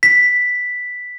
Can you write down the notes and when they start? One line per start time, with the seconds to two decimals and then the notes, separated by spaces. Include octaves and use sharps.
0.03 B6